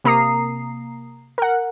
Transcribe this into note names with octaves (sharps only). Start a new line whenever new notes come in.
C3 A#3 A#5 D#6 C7
A#4 F#5